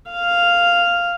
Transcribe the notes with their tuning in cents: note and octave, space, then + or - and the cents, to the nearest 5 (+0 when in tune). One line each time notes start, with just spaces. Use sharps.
F5 -5